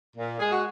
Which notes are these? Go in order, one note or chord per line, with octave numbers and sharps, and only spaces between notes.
A#2
G#3 G#4
F#4